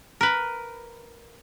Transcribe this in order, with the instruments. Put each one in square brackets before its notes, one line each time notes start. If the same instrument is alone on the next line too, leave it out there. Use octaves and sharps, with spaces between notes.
[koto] A#4 B4